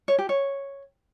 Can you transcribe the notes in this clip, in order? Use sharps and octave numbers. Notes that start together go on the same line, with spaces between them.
C#5
G4
C#5